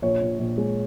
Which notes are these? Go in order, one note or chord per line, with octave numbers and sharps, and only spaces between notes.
A#1 C#5
A#1
A#1
G#3